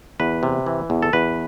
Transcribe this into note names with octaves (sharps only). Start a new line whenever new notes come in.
E2 B4
C3
E3
E2
A4
E2 B4